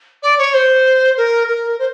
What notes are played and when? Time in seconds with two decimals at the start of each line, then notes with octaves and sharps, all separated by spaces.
0.22 D5
0.38 C#5
0.53 C5
1.16 A#4
1.47 A#4
1.78 C5